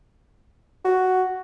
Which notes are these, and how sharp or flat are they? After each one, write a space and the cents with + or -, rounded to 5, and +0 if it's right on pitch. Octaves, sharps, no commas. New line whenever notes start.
F#4 +5